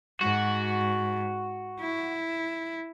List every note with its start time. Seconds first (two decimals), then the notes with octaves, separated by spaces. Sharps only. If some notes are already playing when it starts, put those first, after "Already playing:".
0.21 G#2 F#4
1.80 E4